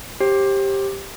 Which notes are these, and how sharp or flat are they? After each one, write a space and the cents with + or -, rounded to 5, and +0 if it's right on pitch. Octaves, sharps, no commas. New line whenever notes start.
G4 +0 C5 +30